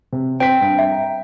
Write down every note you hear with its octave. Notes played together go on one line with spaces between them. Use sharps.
C3
C4 G5 B6
G2
E5
A#5